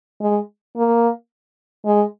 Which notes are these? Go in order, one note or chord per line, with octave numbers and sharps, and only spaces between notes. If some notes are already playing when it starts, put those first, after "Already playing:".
G#3
A#3
G#3